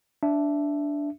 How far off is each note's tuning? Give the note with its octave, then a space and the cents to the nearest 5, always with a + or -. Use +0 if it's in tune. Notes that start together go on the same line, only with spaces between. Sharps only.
D4 -10 E5 +5